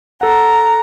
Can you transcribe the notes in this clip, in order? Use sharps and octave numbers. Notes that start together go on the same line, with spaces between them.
A4 F#5 A#5